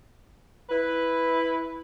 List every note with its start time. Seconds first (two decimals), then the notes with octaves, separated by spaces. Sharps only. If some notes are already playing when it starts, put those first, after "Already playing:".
0.70 E4 B4